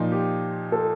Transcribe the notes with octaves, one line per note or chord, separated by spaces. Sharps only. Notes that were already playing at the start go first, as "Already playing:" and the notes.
Already playing: A#2 F3 D#4
G4
A4